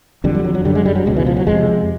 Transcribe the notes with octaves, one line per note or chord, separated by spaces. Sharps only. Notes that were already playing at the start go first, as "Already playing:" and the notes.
F2 D3 G3
G3
F#3
F#3
F#2 D3 G3
G#3
G3
F#3
C#2 B2 G#3
E3
F3
F#3
F2 C3 G#3